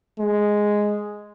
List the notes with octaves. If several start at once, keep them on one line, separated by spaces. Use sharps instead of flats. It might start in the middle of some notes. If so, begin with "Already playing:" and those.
G#3